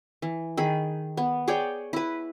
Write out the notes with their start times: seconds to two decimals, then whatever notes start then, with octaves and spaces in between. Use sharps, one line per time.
0.22 E3
0.57 D#3 G#4 B5
1.17 B3
1.48 G#4 C#5 D5 G5
1.93 E4 B4